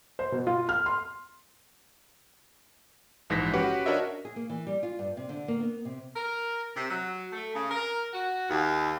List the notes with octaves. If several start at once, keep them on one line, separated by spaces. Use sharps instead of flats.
C5
B2
F4
F6
C6
A#1 G#2 E3 A#6 B6
C#4 F#4 G4 B4 F#5
D4 F#4 A#4 C#5 D#5 E5
G#4
A#3
E3
G3
F4
G2
C3
D3
A#3
B3
C3
A#4
C3
F#3
A3
C#3
A#4
F#4
D#2